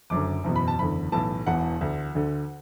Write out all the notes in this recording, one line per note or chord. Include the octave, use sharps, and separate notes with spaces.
F#1 F#2 D3 D6
F#1 E2 B2
B5
A5
F#1 E2 D3 B5
B1 A2 E3 A5
E1 E2 E3 F#5
D2 D3
D2 D3